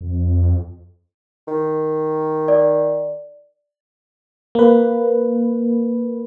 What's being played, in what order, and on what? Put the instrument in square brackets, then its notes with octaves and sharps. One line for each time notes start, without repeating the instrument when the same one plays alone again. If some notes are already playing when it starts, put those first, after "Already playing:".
[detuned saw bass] F2
[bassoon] D#3
[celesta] D5
[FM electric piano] A#3 B4